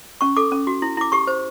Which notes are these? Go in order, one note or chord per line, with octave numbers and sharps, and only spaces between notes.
C#4 C#6
A4 D6
C#4
F#4
E4
E4 D6
G4 C#6
C5